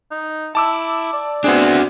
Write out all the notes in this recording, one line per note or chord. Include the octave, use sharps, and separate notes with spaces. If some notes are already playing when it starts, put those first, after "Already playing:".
D#4
E4 A5 D6 E6
D5
B3 C4 D4 F#4 G#4